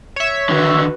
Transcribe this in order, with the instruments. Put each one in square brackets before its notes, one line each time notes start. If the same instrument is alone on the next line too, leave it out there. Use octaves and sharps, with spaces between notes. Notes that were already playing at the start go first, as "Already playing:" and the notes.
[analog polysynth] C#5 E5
[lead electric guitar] D3 D#3 [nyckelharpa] F#4 B4